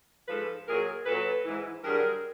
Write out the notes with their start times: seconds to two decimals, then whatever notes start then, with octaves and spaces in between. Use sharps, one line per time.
0.28 G#2 F3 A4 B4
0.67 A#2 F#3 G#4 A#4
1.06 A#2 F#3 A4 B4
1.45 G#2 E3
1.84 G2 D3 F#3 G#4 A#4